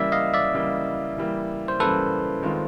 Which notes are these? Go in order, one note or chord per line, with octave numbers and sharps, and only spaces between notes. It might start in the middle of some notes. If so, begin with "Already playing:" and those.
Already playing: C#3 E3 G3 A#3 D5 E5
D#5 F5
D5 E5
C#3 E3 G3 A#3
C#3 E3 G3 A#3
C5
C#3 E3 G3 A#3 A4 B4
D#3 G#3 C4 F4